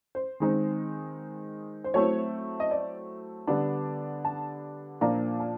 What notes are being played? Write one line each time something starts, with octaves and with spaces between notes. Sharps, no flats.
C5
D#3 G#3 C4 D#4
C5
F#3 A3 C4 E4 C#5
D#5
D5
D3 G3 B3 D4
A5
A#2 F3 A#3 D4 A#5
A5